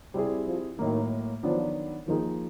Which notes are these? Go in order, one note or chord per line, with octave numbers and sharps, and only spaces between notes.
C3 G3 C4 E4 G#4
F3
A2 D#3 F#3 A#3
D#3 F3 F#3 B3 D4
D#3 F3 A#3 D#4 G#4